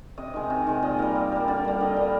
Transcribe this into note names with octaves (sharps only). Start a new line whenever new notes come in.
C3 D#5
D#3 G#3
C3
D#3 G#3
A#2 D#5
G3 A#3 D5
A#2
G3 A#3
D3 D5
G3 A#3
D3 D#5
G3 A#3